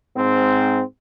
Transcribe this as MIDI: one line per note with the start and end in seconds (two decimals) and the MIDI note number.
0.17 0.82 44
0.17 0.82 60